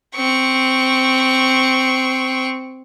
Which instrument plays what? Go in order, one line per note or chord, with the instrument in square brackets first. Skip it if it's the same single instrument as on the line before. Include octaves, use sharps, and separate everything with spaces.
[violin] C4 C#6